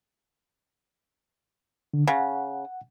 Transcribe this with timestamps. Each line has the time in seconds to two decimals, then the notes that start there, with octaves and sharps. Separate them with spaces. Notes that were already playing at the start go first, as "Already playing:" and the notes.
1.94 D3
2.08 C#3 F#5